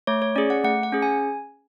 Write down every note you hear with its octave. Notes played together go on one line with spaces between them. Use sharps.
A3 C#5
C#5
C#4 G#4 D5
F#5
A3 F#5
F#5
C#4 G#4
G#5